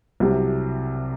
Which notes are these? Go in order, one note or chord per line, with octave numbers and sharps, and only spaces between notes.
C2 C3 F#3